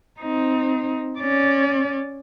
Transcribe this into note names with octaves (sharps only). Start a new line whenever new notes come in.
C4 D#4
C#4 D5